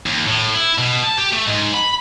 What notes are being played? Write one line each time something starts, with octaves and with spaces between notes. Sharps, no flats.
D#2
A2
E4
B2
A5
G4
A3
G#2
B5